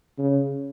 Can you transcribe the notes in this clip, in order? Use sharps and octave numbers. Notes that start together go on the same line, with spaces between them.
C#3